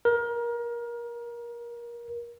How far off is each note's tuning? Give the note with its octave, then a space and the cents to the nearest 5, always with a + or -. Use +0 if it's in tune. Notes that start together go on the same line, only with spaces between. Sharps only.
A#4 +25